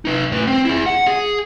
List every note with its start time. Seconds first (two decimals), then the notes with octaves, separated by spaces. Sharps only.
0.05 D#4 B4
0.32 A2 B4
0.47 C4
0.65 E4 G#4
0.86 F#5
1.07 G#4